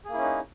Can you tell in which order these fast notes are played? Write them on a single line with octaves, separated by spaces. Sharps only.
G#4 A#3 E4 C#4 D#4